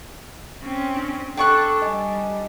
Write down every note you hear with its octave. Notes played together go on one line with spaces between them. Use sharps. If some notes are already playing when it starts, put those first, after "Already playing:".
C4 C#4
D4
D4 A4 G5 C#6 F#6
G3 D#5 G#5